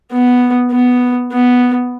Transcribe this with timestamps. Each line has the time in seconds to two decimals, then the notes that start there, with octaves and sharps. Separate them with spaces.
0.11 B3
0.72 B3
1.32 B3